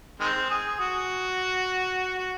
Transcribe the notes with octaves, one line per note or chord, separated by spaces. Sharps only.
D#3 G#3 C4
G#4
F#4
F#4